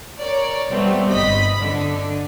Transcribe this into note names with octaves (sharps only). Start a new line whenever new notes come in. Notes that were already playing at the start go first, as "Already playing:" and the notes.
A#4 C#5 D5
G3 A3 B3 C4
G1 D#5 B5 B6
D3